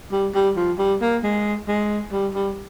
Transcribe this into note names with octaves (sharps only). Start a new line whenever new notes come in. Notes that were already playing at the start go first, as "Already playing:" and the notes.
G3
G3
F3
G3
A#3
G#3
G#3
G3
G3